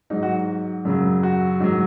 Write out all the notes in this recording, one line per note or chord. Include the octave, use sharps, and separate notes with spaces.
G#2 F#3 D#4
F#4
F#2 C#3 F#3
F#4
G#2 D#3 F#3